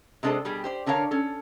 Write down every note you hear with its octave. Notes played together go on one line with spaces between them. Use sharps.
C3 G#3 D4 A4 C5 D#5
B2 G3 G4 G#4
G4 C5 D5
D3 D4 A#4 C#5 F5
C#4 A4